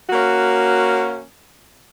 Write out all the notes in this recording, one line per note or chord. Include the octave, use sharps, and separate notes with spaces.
A#3 C#4 F#4